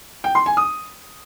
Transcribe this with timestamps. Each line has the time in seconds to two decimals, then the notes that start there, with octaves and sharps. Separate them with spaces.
0.24 G5
0.35 C6
0.46 G#5
0.57 D#6